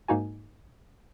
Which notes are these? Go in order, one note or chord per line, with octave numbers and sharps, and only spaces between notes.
G#2 A#3 D#4 F#4 G#5